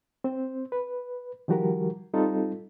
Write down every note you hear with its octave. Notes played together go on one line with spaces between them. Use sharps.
C4 C5
B4
D#3 F3 G3 F#4 G4 A#4
G3 C4 D#4 F4 A4